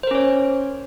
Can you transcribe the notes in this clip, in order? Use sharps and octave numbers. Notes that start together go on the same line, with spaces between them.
C#4 A#4 C5 C#5